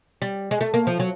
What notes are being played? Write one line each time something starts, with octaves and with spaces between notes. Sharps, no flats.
G3
G#3
A3
A#3
F3
F#3